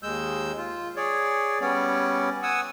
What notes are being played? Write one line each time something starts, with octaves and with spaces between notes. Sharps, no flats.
D#2 G#3 E6 G6
F4
G#4 C#5 D5
G3 B3 C#4 C#5 D5
F#5 G#5 D#6 E6